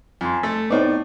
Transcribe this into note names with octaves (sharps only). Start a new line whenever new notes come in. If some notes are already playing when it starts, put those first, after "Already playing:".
F2 G#5 C6
A3 A4
A2 B3 C4 D#4 D5